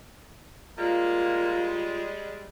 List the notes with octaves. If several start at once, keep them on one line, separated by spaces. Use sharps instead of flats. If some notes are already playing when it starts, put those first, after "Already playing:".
G3 G#3 A#3 F4